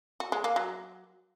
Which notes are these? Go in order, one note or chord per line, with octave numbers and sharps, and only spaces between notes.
F#4
G#3
A#3
F#3